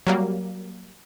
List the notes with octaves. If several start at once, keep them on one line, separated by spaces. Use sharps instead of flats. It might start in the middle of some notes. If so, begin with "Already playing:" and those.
F#3 G3 A#3